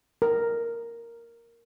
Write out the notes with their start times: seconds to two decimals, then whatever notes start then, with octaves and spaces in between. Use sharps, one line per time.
0.22 A#4